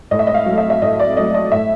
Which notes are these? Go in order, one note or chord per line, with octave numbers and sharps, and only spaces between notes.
A2 D#5
E5
D#5
F5
F#3 A3
E5
E5
A2 D#5
D5
F#3 A3 D#5
D#5
A2 E5